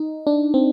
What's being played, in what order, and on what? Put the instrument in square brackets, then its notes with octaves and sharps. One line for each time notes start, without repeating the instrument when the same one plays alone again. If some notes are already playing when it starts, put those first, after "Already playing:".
Already playing: [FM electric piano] D#4
D4
C4